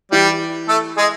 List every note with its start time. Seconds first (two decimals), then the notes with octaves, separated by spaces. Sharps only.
0.12 E3 G3 G4
0.68 A3 A4
0.97 G#3 G#4